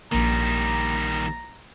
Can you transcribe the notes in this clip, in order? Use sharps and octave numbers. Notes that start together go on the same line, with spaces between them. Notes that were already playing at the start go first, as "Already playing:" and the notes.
A#1 D#3 G3 A#3 A#5